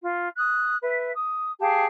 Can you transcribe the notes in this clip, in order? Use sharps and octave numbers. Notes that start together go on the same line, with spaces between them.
F4
D#6 F#6
B4 E5
D#6
G4 G#4 F5 A5